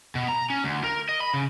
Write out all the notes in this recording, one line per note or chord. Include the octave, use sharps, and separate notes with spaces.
B2
A#5
C#4
D2
A#4
D#5
B5
C#3